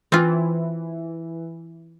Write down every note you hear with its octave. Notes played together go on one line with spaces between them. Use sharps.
E3 C4 F4